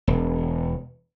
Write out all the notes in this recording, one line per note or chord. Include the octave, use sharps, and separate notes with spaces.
E1